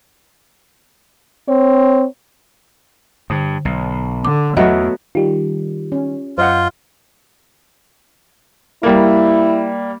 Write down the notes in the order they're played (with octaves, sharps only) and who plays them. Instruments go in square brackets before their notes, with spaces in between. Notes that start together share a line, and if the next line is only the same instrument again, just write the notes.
[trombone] C4 [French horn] C#5
[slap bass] G2 [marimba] D3
[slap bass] B1
[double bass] D3 [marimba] D6
[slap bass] E2 [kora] F#3 B3 F#4 [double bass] A3 [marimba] D#5 E5 B5
[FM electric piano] D#3 G3 [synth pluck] F4 G4
[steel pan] C#4
[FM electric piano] F#2 [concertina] F4 [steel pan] C5 D#5 F#5
[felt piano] G3 A#3 [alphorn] E4